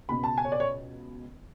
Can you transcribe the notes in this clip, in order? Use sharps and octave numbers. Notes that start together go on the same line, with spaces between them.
C#2 B2 B5
A5
G#5
C#5
D5
C#5